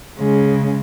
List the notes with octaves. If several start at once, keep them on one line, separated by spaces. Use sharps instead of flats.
C#3 G#3